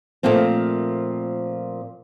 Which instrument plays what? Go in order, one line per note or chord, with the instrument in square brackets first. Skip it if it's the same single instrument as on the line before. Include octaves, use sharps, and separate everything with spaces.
[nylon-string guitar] A#2 F3 A3 A#3 C4